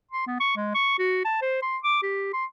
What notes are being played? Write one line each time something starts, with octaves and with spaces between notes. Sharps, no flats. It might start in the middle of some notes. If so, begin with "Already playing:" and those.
C6
B3
C#6
G#3
C#6
F#4
A5
C5
C6
D6
G4
C6